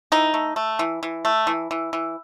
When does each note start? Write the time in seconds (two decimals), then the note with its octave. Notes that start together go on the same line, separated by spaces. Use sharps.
0.12 E3 D#4
0.34 A3
0.56 A3
0.79 E3
1.03 E3
1.25 A3
1.47 E3
1.71 E3
1.93 E3